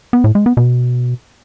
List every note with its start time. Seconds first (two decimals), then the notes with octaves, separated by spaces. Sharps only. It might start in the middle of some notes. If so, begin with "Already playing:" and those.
0.13 B3
0.24 A2
0.35 G#3
0.46 B3
0.57 B2